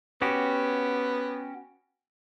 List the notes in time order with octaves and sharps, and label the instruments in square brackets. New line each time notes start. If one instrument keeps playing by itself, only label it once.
[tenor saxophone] B3 [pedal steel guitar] C#4 F#4 G4